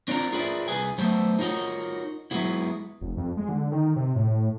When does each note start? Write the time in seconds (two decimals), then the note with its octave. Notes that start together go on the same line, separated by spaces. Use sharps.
0.08 C4 D4 D#4 F4 A#4 A#5
0.32 F4 G#4 A#4 B4 D5 E5
0.68 C2 G#4 B4 G#5
0.98 F#3 A3 B3 A4 C5 E5
1.39 D#4 F4 F#4 A#4 C#5 D#5
2.31 F#3 G#3 B3 E4
3.01 F1
3.17 F2
3.37 G#3
3.49 D3
3.72 D#3
3.96 C3
4.15 A2